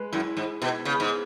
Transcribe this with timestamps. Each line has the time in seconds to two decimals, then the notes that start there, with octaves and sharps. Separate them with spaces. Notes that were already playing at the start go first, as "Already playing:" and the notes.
Already playing: G#3 B4
0.12 F#2 E4
0.37 G#2 E4
0.61 B2 B3
0.85 C#3 B3
1.00 G#2